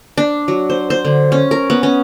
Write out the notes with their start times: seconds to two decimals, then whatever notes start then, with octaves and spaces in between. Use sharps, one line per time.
0.17 D4
0.48 F#3
0.70 C5
0.90 C5
1.05 D3
1.32 C#4
1.51 A#4
1.70 B3
1.83 C#4